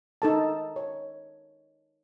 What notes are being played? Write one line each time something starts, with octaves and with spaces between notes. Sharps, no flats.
D#4 A4 A5
C#5